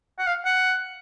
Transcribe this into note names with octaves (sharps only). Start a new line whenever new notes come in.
F#5
F5
F#5